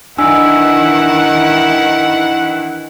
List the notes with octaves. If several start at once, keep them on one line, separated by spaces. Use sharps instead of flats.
D#3 E3 D4 E4 F#5 G#5 E6